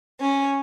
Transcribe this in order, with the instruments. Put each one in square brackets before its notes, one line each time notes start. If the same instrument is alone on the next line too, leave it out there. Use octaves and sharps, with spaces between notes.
[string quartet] C#4